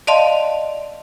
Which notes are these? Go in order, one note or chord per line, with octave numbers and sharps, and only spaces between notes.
D5 D#5 F5 A5 C6